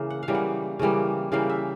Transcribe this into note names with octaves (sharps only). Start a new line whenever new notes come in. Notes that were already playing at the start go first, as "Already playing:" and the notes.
Already playing: C#3 E3 A#3
F#5
F5
C#3 E3 G3 A#3
F#5
C#3 E3 G3 A#3
C#3 E3 G3 A#3 F5
E5